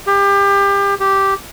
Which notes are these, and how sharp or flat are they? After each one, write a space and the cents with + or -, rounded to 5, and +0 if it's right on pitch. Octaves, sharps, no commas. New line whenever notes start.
G4 +30
G4 -5